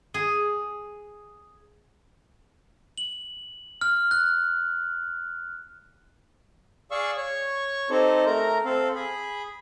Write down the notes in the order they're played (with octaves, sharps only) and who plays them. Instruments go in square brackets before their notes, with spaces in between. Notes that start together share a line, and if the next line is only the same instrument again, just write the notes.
[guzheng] G#4
[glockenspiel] F#7
F6
F#6
[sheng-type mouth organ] G#4 D5 F5 C#6 E6
C#5 C#6
C4 D#4 G4 A4 C5
A3 A#4 A#5
C4 A4 F5
G#4 B5